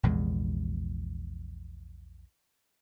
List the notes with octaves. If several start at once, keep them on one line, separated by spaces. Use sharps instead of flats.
A#1 E2 C3 G#3